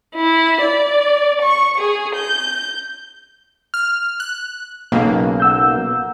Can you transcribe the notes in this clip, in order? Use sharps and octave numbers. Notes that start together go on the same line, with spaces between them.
E4
D5
C#6
G#4
G6
F6
F#6
B1 C#3 A#3
F#5 E6 G6